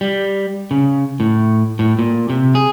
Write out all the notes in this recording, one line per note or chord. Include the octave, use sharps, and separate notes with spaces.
G3
C#3
A2
A2
A#2
C3
G#4